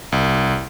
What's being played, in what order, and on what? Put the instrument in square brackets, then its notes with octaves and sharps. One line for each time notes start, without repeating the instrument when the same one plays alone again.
[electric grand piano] C2